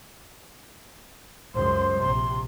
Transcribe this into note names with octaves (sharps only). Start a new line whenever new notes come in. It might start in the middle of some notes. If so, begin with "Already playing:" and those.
C#2 F#2 C5 C6
A#1 C3 C6